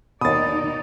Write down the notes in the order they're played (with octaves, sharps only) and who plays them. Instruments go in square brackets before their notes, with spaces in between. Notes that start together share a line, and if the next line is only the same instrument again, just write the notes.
[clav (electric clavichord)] D#2 B2 [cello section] D#4 D5 [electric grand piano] D#6 A6